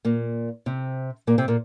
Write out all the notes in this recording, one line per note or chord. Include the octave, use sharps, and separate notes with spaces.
A#2 A#3
C3 C4
A#2 A#3
C3 C4
A#2 A#3